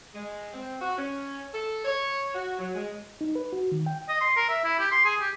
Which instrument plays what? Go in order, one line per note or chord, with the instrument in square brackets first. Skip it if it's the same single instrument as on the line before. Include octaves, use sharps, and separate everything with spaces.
[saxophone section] G#3
C4
F#4
C#4
A4
C#5
F#4
F#3
G#3
[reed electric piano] D#4
B4
F#4
D#3
G5
[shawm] D#5
C6
A#4
E5
E4
G4
C6
G#4
G4